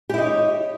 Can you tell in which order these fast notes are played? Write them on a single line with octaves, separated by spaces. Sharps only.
G4 E4 D#4 C#5